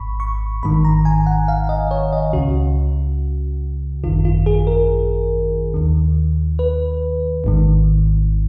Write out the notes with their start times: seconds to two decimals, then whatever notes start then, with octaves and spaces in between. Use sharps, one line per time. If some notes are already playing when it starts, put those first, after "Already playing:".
Already playing: G#1 G#2 B5 C#6
0.20 C#6
0.63 G#1 G#2 D#3 B5
0.84 A#5
1.05 G#5
1.26 F#5
1.48 F5
1.69 D#5
1.91 C#5
2.13 D#5
2.33 C#2 C#3 F#4
4.04 G#1 F#2 D#3 F4
4.25 F4
4.46 G#4
4.67 A#4
5.74 D#2 D#3
6.59 B4
7.44 G#1 G#2 D#3